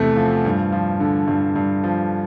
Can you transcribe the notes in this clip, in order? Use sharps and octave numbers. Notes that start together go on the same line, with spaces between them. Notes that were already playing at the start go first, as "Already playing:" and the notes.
Already playing: E2 C3 A3
F3
G2
F3
D3
G2
G2
F3